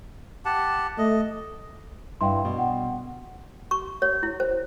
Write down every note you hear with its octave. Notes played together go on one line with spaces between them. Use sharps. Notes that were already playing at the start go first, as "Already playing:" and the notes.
G4 F#5 A5
A3 D#5
G2 E4 F5 G5 C6
B2
F#5 G5
C#6
C#5
E4
C5